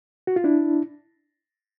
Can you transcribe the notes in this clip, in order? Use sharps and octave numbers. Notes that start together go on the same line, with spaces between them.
F#4
F4
D4 E4